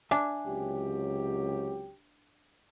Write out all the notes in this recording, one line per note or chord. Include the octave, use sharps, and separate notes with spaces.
D4 E5 G#5
C#2 C3 F#3 G4